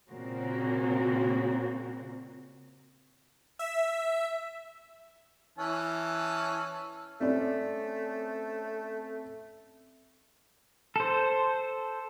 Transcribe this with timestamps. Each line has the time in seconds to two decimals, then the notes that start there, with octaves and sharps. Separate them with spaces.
0.10 A#2 C#3 A#3 C4 F#4
3.59 E5
5.58 E3 C#4 A5
7.21 A3 C4 C#4 D5
10.96 A4 C5